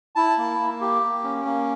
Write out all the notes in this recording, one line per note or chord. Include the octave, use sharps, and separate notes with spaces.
E4 A5
A#3
A#3
G4
A#3
C#4
A#3